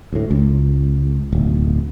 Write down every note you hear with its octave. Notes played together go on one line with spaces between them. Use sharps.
D2 A2
C#2
D1 B1